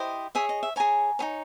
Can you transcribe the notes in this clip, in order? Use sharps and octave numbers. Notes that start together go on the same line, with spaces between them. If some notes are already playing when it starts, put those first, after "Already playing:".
Already playing: E4 G4 C5 D#5
G#4 C#5 E5
D#5
E5
G#4 C#5 G#5 A#5
D#4 G#4 C#5